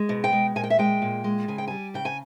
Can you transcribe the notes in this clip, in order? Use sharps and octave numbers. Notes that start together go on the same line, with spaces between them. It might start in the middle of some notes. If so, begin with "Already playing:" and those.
Already playing: G#3
B2
G5
G#3
A#2 G#5
G5
E5
G#3 G5
A#2
G#3
C#3 G#5
G5
G3 G#5
C#3 G5
G#5